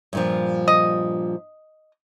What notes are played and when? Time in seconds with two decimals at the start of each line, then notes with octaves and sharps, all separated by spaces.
0.13 G2 A#2 F3
0.68 D#5